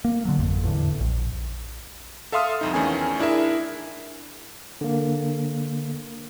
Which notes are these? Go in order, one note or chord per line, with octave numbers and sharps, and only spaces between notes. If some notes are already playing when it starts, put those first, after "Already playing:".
A#3
D3 F#3
G#1 F2
E2 A2 D3
A#1
A4 E5 F5 C6 D#6 F6
C2 F2 D#4
E2 D#3 A3 C#4 G#5
D4 E4 G#4 A#4 E5
D3 A#3